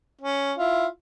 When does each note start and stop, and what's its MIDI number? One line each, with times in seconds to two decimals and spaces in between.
0.22 0.53 61
0.58 0.86 64
0.58 0.86 65